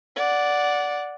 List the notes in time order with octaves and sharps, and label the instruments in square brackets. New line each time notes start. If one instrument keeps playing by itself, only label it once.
[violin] D5 F#5